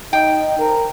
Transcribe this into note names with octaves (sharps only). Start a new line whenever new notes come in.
D#4 G5
A#4